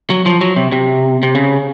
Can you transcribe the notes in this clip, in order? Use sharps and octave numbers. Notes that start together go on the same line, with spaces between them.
F#3
F3
F#3
C3
C3
C3
C#3